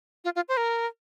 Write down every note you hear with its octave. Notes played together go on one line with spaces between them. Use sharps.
F4
F4
C5
A#4